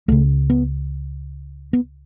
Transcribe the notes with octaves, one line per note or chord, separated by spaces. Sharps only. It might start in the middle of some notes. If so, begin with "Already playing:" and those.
C#2 C#3 A3
B3
B3